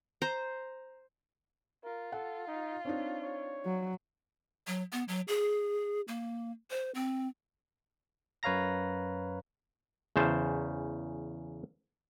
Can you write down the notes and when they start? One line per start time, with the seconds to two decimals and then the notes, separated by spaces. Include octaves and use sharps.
0.22 C5 A#5
1.84 F4 A#4
2.12 A4 F#5
2.47 D#4
2.85 C4 D4 D#4 C#5
3.22 C#5
3.65 F#3
4.67 F#3
4.92 B3
5.08 F#3
5.28 G#4
6.08 A#3
6.70 C5
6.94 C4
8.43 F#2 B4 C#5 F5 A#5 A#6
10.16 E2 C#3 C5 A5